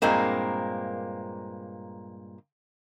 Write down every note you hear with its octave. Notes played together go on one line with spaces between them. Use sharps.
G2 A#2 G#3 A#3 C4